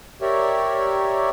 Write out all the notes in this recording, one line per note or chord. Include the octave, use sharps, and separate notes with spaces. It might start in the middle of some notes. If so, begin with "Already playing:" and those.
G4 A#4 C#5 D5 E5